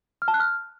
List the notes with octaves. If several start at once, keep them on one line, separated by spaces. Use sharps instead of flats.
F6
A5
F#6
F6